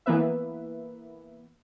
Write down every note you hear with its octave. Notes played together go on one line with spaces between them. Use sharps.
E3 A#3 B3 B4 E5